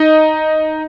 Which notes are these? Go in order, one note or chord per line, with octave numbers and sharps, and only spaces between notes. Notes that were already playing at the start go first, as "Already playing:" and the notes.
Already playing: D#4 D#5